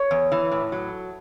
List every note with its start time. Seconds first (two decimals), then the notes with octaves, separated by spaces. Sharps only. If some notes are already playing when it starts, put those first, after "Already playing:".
Already playing: C#5
0.11 E2
0.32 E3
0.52 A2
0.72 F#3